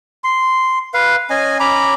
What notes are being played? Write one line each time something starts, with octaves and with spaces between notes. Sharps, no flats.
C6
B4 F5
C#4 D#5 G#5
C#4 A#5 B5 D6